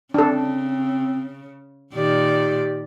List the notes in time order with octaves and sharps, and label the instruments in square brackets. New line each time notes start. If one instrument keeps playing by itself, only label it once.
[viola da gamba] C#3 [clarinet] C4 [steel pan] D4 A4
[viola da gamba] A#2 D#3 D5 [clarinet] G4